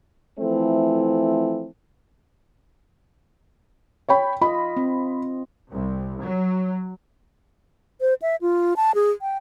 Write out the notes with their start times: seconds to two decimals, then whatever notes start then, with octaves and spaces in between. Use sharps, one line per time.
0.39 E3 F3 A3 C4 E4 A4
4.09 C#5 G5 B5
4.42 F4 D#5 B5
4.77 C4
5.71 C2
6.21 F#3
8.01 C5
8.22 E5
8.41 F4
8.76 A5
8.95 G#4
9.22 G5